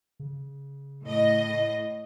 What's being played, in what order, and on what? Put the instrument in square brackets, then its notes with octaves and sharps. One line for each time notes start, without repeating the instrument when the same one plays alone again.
[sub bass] C#3
[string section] A2 D#5